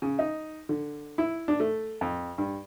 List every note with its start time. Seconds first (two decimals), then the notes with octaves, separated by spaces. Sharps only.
0.02 C#3
0.19 D#4
0.69 D3
1.18 E4
1.48 D4
1.60 A3
2.01 F2
2.38 G2